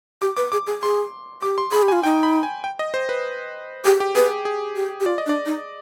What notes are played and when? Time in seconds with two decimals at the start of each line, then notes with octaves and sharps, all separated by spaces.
0.22 G4 D6
0.37 B4 D6
0.52 G#4 D6
0.67 G#4
0.83 G#4 C6
1.42 G4 D6
1.58 C6
1.72 G#4 B5
1.83 G4
1.88 G#5
1.92 F4
2.03 D#4 G5
2.23 B5
2.43 G#5
2.64 G5
2.79 D#5
2.94 C5
3.09 B4
3.85 G4 G#4
4.00 G4
4.15 G#4 B4
4.45 G#4
4.76 G4
5.00 G4
5.05 F4 D5
5.18 D#5
5.26 D4
5.29 D5
5.46 D#4